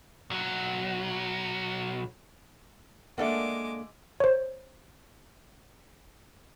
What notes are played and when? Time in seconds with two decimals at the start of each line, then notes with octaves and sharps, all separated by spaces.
0.30 B1 F#3
3.18 G#3 A#3 D4 A4 D5 E5 F#5 D6
4.20 C5 C#5